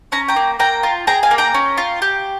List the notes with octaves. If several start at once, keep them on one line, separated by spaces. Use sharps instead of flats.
C#4 A#5
G5 A#5
A#3
A#3 G5 A#5
F4
G#4 G5 A#5
F5 G#5
A#3
G5 A#5
C#4
F4
G4